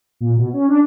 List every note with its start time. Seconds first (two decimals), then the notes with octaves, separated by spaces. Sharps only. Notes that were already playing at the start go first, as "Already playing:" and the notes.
0.20 A#2
0.37 B2
0.53 C#4
0.69 D4